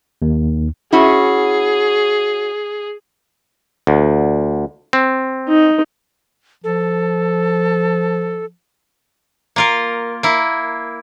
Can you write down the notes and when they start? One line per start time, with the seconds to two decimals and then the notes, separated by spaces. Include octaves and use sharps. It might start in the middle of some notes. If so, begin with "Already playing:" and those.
0.22 D#2
0.93 C#4 E4 F#4 G#4
3.87 D2
4.93 C4
5.48 D#4
6.64 F3 A4
9.56 A#3 F4 A#4
10.23 A#3 E4